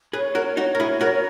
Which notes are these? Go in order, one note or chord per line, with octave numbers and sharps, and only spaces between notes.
G#4 B4 C#5
F#4 A#4
D#4 F#4 C#5
A#4
E4 G#4
F#4 A#4 A#5